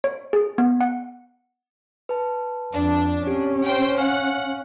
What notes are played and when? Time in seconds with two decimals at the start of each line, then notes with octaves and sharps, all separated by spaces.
0.04 C#5
0.33 G#4
0.58 B3
0.81 F#5
2.09 B4 A5
2.73 F2 D4
3.26 C4 C#4 G4 D7
3.65 C5 G5
3.98 F5 F#5 G#5 F6